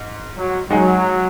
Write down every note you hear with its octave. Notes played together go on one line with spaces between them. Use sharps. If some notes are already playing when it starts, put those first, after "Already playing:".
Already playing: G#2
F#3
F#3 G#3 D#4 G#4